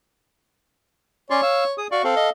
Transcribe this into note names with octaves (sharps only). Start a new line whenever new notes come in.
C#4 C#5 D5 C6
F5 E6
G#4 D#6
F#4 D5 F5 C#6
C4 A4 F5
D#5